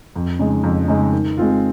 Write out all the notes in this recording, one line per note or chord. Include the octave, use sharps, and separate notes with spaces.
F2
C#3 G#3 D#4
F2
C#3 G#3 D#4
D#3
G#3 C4 F4